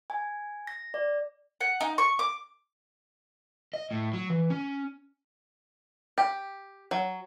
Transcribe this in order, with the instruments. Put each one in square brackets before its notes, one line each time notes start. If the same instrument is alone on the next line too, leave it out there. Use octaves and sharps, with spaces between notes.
[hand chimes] G#5
A#6
D5
[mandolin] F#5
D#4
C#6
D6
[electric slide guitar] D#5
A2
F#3
E3
C#4
[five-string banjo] G4
F#3